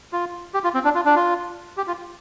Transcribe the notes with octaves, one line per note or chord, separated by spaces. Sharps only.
F4
G4
F4
C4
D4
F4
D4
F4
G4
F4